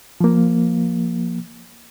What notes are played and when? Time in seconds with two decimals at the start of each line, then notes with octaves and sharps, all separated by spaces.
0.21 F3 A#3